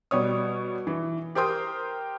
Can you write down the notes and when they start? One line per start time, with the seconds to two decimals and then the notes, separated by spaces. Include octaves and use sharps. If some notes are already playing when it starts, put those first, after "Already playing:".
0.11 B2 G3 C#5 D#6
0.87 E3
1.35 G4 A#4 C5 G5 C6 D#6